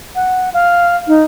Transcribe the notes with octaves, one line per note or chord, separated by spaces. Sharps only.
F#5
F5
D#4